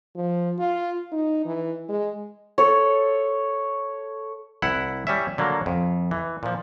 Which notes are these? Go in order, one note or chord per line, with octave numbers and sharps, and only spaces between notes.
F3
F4
D#4
E3
G#3
A4 C#5
C2 E4 F#5
G3 C#4 E5
D3 F#3 A#3
F2
E3
A#2 F3